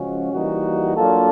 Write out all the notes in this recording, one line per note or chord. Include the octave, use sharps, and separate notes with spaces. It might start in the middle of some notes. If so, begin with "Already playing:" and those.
Already playing: C#3 F3 G#3 C#4 F#4
E3 G3 A#3 D#4 F#4
F#3 A#3 D4 F4 A4